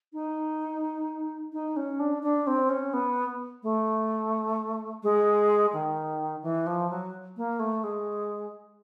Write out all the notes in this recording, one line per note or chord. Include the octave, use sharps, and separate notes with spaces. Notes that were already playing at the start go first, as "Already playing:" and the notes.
D#4
D#4
C#4
D4
D4
C4
C#4
B3
A3
G#3
D#3
E3
F3
F#3
A#3
A3
G#3